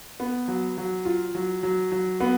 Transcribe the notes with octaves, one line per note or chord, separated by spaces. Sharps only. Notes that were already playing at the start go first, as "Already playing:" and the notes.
B3
F#3
F#3
F4
F#3
F#3
F#3
B3